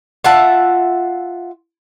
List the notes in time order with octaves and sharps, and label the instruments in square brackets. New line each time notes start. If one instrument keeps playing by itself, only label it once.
[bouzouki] F4 E5 F#5 A5